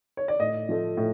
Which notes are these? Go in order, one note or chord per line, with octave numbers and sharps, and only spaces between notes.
C#5
D5
A2 D#5
F3 A3
A2